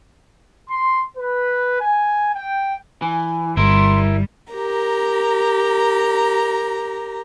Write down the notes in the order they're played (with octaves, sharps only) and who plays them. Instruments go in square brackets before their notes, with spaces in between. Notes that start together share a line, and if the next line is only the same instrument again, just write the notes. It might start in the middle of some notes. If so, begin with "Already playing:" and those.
[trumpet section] C6
B4
G#5
G5
[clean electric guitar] E3 [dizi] G#5
[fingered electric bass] G1 [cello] G3 [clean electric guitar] E4 A#4 [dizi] C6
[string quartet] G4 A#4 A#5